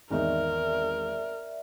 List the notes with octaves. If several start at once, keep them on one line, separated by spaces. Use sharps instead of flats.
G#1 E2 D#4 A#4 D5 E5